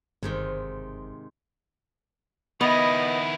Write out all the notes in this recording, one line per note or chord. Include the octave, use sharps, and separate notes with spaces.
G1 G#2 C3 D#3
D#3 B3 E4 D#5